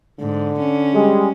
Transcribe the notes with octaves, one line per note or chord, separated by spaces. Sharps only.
G#2 D3
C#4
G3 G#3